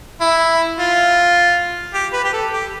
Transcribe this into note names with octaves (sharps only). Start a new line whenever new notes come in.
E4
F4
G4
B4
G4
A4
G4